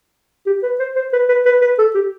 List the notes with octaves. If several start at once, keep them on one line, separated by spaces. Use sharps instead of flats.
G4
B4
C5
C5
B4
B4
B4
B4
A4
G4